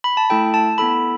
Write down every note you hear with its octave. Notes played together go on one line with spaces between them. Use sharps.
B5
A5
A3 E4 A4 G5
A5
B3 E4 A4 B5